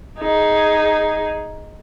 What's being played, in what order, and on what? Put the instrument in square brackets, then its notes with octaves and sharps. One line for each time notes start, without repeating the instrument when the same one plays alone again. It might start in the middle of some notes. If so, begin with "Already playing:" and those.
[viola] D#4 G#4